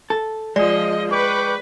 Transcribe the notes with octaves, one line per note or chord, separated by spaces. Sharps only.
A4
F3 G#3 D5 D#5
B4 G5 C#6 D6